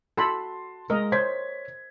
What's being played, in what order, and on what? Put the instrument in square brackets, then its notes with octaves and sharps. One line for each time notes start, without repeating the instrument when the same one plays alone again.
[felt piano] F#4 A5 C6 [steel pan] A4 B5
[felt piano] G#3 [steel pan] A#4 D#5
[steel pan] C5 [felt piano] C#5 G#6 B6